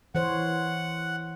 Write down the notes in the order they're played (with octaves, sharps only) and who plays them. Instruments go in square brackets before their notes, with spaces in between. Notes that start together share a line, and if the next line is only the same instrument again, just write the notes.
[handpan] E3 C5 C#5 [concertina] F#5